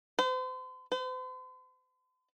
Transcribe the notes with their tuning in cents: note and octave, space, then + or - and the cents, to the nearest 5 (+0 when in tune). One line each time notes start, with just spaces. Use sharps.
C5 -40
C5 -45